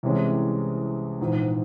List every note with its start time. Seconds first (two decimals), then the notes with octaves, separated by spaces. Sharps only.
0.03 C2 C3 E3 G#3 C#4
1.20 A#1 G#2 E3